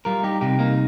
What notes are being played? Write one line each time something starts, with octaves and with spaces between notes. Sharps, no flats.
G3 F4 A#4
D#4 G4
C3 D#4 G4
A#3 D#4